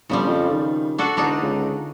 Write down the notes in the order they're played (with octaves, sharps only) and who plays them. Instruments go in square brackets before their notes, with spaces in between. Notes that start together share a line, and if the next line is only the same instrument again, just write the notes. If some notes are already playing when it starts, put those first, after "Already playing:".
[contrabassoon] G1 [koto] C#3 F3 G3
[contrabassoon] F2
D#3
[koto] D4 F#4 A4
[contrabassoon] E1 [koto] D3 D4 D#4
[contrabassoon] C#2